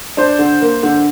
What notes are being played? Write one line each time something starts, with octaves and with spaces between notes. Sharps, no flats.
D4 C5
D3
A#3
D3